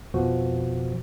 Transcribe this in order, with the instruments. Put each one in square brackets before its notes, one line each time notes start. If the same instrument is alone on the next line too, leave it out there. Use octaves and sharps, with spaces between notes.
[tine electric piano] F2 B2 F3 F#4